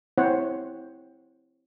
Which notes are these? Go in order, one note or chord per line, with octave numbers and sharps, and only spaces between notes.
C4 E4 C5 C#5 F#5